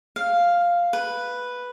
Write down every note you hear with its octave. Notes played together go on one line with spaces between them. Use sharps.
F5
B4